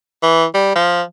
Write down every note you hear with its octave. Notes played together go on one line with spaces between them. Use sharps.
E3
G3
F3